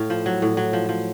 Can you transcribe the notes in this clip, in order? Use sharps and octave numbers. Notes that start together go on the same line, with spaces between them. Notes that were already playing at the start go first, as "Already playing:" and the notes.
Already playing: A2 F5
F3
F#3
A2
F#3
F3
F3